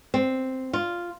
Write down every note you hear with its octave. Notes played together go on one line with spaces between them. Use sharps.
C4
F4